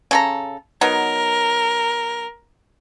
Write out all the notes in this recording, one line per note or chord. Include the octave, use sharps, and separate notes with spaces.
C#3 A4 A#5
F#3 B3 D#4 A#4